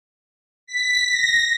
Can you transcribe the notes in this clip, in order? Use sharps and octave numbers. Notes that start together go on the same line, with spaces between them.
B6
A#6